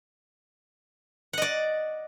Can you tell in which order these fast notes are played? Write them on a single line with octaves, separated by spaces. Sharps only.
F#5 D#5 D5